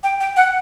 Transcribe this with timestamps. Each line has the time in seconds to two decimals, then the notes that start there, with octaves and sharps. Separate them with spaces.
0.03 G5
0.20 G5
0.36 F#5